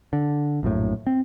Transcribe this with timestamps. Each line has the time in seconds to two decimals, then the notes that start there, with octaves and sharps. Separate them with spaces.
0.13 D3
0.63 A#1 F#2 A2
1.07 C4